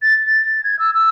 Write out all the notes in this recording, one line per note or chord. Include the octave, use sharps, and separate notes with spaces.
A6
A6
G#6
E6
E6